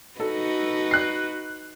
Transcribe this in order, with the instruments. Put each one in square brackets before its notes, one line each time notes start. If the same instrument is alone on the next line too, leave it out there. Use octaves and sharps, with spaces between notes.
[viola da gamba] D#4 F#4 B4 [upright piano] A4
[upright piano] F#6 C7